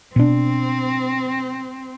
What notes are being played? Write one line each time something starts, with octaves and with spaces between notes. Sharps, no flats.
B2 C4 D4